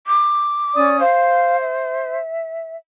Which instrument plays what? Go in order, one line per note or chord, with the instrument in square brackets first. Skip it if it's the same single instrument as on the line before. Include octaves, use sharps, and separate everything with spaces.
[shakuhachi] D6
[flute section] C#4 D5 D#6
[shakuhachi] C5 [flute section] F5
[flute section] E5